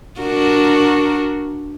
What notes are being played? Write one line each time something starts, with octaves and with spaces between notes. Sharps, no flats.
D4 F#4 A#4